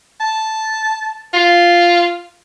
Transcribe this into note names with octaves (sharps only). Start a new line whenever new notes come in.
A5
F4